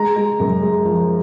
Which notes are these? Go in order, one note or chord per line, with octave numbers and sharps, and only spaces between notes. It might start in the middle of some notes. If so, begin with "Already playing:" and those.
Already playing: G#3 A#5
G#3
F#2
G#3
F3